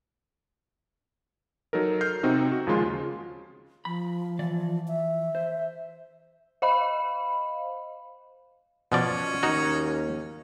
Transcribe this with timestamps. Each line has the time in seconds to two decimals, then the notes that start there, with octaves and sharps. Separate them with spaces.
1.73 F#3 D#4 A4 A#4
2.01 F6 G6 C7
2.23 C3 C4 D#4 F#4
2.52 F#4
2.67 D#2 C#3 F3 G#3 F4 C6
3.85 F3 B5
4.39 E3 D5
4.87 E5
5.35 C5
6.62 C5 D#5 F5 B5
8.92 B2 F3 C#4 D5
9.43 D#2 D#4 F#4